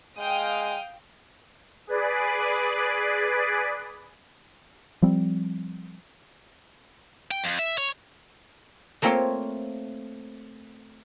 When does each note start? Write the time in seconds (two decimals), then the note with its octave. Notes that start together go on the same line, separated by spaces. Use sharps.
0.18 G#3 F5 G5 D#6
1.87 G#4 B4 D5
5.02 F3 G3 C4
7.31 G5
7.44 F2
7.59 E5
7.78 C#5
9.02 A3 A#3 C4 F4 A4 C#5